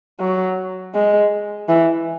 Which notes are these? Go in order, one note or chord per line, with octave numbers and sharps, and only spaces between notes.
F#3
G#3
E3